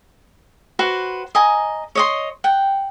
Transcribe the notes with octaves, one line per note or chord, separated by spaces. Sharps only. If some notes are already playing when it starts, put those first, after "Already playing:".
F#4 B4 C5
D#5 G#5 A#5
C#5 D#5 C6
F#5 G5